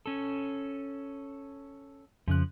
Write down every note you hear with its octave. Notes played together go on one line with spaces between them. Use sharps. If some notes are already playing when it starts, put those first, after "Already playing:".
C#4 A4
F2 C#3 F3 F#6